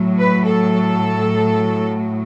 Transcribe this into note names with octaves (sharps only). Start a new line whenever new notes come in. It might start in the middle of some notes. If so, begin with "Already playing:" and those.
Already playing: A2 F#3
B4
A4